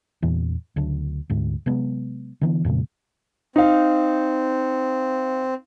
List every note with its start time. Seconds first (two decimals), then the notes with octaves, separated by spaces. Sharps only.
0.22 E2 A#2 E3
0.76 D2 C#3 F#3 D4
1.30 D2 G#2
1.66 C3 F#3 G#3 B3
2.41 D3 E3 B3
2.65 F2 A#2 C#3 G#3
3.56 C4 D#4 F5